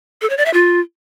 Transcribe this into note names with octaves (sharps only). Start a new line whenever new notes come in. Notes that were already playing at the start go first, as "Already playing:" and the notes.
A4
C#5
D5
E5
F4